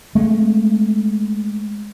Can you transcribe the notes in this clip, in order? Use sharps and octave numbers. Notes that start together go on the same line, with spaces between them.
G#3 A3 C4